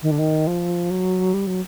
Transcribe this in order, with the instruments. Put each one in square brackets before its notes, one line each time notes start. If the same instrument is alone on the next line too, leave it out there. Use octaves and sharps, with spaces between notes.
[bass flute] D#3
D3
D#3
F3
F#3
G3
F#3